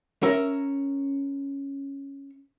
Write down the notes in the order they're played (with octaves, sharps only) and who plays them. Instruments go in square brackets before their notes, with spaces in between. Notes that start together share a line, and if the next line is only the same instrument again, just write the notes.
[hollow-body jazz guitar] C#4 A#4 E5